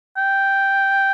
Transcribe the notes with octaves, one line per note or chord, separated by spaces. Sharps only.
G5